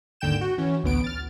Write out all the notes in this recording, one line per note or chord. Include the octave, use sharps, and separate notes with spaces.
G#1 D#2 D3 G5 G6 E7
F#4
E3 C#4
A1 D2 B3 D7
F6 A6